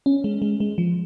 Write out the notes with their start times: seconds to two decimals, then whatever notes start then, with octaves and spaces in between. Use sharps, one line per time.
0.06 C#4
0.24 G#3
0.42 G#3
0.60 G#3
0.78 F3